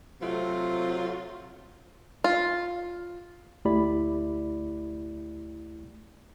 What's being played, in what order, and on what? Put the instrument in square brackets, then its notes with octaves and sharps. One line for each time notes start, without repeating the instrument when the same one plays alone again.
[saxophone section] C3 F#3 A3 C4 F4
[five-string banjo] F4
[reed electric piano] D2 A3 E4 G4 D5 B5